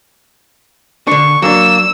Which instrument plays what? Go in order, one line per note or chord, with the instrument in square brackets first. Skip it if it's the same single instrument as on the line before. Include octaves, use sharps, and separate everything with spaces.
[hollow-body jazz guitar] D3 D4 [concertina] C#6
[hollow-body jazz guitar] F#3 D4 [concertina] A#3 [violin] E6